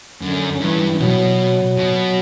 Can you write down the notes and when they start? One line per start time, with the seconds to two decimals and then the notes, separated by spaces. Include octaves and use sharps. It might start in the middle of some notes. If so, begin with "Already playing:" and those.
0.22 F#2 D3
0.61 G2 E3
1.00 B2 F#3
1.77 B2